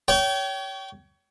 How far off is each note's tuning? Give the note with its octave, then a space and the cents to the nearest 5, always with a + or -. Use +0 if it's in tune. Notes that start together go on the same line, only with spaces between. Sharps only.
C#5 +20 G5 -25 C#6 +30